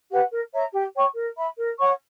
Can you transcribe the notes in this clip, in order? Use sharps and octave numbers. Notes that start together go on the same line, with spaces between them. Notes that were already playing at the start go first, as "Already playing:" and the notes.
G4 B4 F#5
A#4
C#5 E5 A#5
G4
C#5 G5 C#6
A#4
E5 B5
A#4
C#5 F#5 C#6